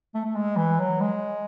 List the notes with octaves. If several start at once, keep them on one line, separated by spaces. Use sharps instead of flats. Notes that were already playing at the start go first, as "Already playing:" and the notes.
A3
A3
G#3
E3
F#3
G#3